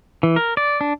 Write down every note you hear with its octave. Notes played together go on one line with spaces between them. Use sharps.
E3
A#4
D5
D4